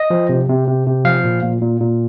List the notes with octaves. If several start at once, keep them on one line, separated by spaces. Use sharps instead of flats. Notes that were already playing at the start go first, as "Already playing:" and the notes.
Already playing: D#5
F3
C3
C3
C3
C3
F3 F5
A#2
A#2
A#2
A#2